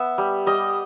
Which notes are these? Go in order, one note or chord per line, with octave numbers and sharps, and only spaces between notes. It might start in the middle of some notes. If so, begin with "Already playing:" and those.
Already playing: B3 E5
G3
G3 D#5